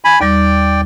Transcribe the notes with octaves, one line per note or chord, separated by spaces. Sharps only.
G#5 B5
D#2 G3 D5 G5